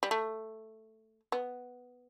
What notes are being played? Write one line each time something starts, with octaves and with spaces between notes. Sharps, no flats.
G3
A3
B3